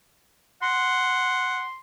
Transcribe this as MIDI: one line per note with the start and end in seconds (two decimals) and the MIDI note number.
0.62 1.63 78
0.62 1.80 84